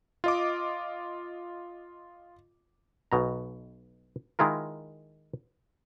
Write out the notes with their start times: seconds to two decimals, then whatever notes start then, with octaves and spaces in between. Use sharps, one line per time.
0.24 F4 D#5 D6
3.12 B1 B2 A#5
4.39 D#3 G#3 E4 F4 A#4